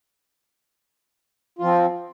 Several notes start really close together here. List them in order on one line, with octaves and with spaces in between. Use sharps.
F4 F3 C4